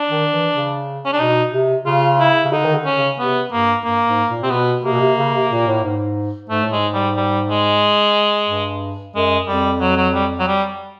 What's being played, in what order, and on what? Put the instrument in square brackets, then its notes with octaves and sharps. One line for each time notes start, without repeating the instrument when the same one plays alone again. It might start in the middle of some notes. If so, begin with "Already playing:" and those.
Already playing: [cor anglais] D4
[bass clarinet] D#3
E3
C#3
[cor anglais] C#4
D4
[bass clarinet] B2 [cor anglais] D#4
[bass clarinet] C3
[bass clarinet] C#3 [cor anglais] F4
[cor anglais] E4
[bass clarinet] C#3
[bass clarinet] D3 [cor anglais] D#4
[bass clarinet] D#3
D3
[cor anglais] C#4
[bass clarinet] C#3
[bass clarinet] C3 [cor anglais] B3
[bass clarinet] G2 [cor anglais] A#3
[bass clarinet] G2 [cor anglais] A#3
[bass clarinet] G#2
A#2
[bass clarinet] C3 [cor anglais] C4
[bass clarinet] B2 [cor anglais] B3
[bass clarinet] C3 [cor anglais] A#3
[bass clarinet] B2
C3
C#3
C3
A#2
A2
G#2
[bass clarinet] G#2 [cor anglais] A3
[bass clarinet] A2
[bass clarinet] G#2 [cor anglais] G#3
[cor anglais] G3
G3
G#3
[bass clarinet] G2
[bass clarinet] F#2 [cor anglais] G#3
[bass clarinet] F2 [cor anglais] G3
[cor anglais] F#3
F#3
G3
F#3
G3